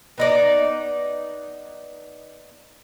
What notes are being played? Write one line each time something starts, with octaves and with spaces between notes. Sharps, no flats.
B3 D#4 D5